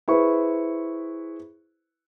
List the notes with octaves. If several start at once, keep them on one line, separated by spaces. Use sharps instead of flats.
E4 G#4 B4 C5 C#6